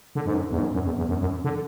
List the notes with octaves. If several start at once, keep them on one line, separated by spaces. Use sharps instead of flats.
D3
G#2
F#2
E2
G#2
F#2
F#2
E2
E2
F#2
F#2
D3